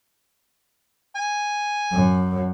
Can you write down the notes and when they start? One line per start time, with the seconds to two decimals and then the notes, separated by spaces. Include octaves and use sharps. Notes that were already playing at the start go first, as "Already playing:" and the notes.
1.16 G#5
1.92 F#2